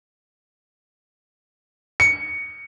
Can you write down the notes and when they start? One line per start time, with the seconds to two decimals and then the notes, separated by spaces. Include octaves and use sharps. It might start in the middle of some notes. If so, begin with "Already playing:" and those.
2.00 C#7